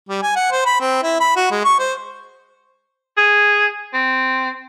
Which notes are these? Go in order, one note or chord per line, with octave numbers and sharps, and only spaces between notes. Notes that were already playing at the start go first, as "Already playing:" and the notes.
G3
G#5
F#5
C5
B5
C4
E4
B5
F#4
G#3
C#6
C5
G#4
C4